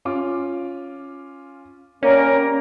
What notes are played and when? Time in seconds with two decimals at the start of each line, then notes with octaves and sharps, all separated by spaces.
0.05 C#4 F4 D6
2.03 G3 A#3 C#4 A#4